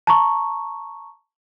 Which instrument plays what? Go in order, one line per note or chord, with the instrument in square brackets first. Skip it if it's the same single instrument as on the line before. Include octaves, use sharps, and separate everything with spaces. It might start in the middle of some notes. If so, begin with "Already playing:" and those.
[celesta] A5 A#5 C#6